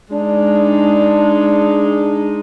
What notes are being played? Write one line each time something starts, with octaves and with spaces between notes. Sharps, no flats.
G#3 D4 D#4